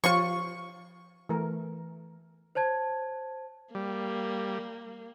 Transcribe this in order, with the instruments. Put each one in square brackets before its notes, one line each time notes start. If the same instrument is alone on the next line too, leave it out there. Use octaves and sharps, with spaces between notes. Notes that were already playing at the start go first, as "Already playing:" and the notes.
[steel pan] F3 G4 [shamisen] F4 C5 C#5 [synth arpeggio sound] C#6
[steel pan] E3 A3 A#4
[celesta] C5 C#5 A5 G#6
[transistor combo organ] G3 [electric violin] A#3